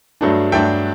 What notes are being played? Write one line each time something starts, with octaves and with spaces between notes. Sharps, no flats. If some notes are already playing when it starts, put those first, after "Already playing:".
G2 F#3 A3 D4
G2 F#3 A3 D4 E5 G5